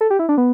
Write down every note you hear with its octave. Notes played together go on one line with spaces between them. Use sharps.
A4
G4
E4
D4
B3